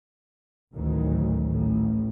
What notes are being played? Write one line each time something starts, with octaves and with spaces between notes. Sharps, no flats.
A1 D2 A2 D#3 F#3
A1 A2